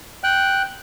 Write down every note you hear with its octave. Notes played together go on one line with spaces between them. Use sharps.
G5 F#6